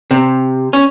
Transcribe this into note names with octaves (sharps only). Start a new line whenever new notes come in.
C3
C#4